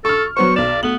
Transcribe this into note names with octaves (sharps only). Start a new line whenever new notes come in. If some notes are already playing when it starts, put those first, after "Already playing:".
A4 C#6 F6
F#3 B3 C5 C#6
B1 D5 E7
A3 B3 F#7